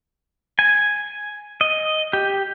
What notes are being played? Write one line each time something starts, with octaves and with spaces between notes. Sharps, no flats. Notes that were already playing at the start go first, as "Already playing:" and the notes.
G#5
D#5
G4